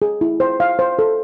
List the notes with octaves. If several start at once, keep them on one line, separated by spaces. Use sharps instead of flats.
G#4
E4
C5
F5
C5
A4